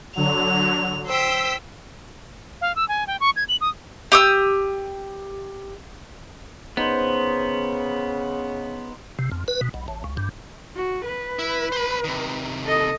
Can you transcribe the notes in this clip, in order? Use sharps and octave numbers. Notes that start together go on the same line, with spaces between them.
D3 F#3 F7
C5 G5 E6 B6
F5
E6
G#5
G5
C#6
G#6
F#7
D#6
G4 D#6 E6
C#3 B3 D#4 C5
C3
F2
B4
B2
B1
A1
C#2
G2
F#4
B4
E4
C5 B5
C3 D#3
A4 D#5